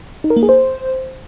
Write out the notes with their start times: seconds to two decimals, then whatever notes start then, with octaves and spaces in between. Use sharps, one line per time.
0.24 D#4
0.30 A#4
0.37 A#3
0.43 G#4
0.49 C5